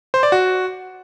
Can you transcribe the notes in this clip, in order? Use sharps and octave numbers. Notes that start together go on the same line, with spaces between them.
C5
D5
F#4